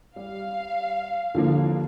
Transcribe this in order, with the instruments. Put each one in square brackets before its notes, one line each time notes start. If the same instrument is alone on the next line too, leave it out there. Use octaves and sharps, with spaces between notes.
[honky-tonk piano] G3 [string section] F5
[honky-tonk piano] D#2 F3 A#3 [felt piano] D3